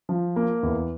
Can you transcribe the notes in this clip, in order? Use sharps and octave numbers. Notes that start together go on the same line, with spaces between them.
F3
A#3
E2